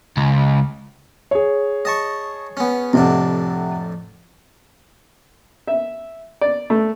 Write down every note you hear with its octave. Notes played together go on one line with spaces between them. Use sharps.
C#2
G#4 C#5
D#5 A5 C#6
B3 C#4
F2 A2 C3 D4 F#5
E5
D5
A3